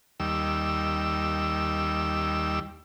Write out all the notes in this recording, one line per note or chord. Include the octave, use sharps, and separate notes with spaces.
D#2 G3 E6